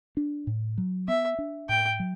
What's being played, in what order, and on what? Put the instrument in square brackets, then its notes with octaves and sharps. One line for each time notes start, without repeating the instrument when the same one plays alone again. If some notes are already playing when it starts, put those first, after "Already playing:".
[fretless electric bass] D4
A2
F#3
[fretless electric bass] B3 [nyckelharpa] E5
[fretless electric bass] D4
[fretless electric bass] A2 [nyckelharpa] G5
[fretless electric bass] F#3